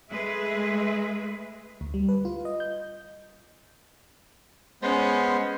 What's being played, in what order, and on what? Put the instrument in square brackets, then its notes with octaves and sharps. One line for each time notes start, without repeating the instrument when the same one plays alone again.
[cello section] G#3 A3 G#4 B4 E5
[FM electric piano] D2
G3
B4
F4
D#5
G6
[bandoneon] G#3 B3 C5 [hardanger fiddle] C#4